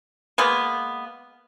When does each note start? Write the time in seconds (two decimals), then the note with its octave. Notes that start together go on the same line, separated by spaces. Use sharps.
0.38 G#3 A#3 B3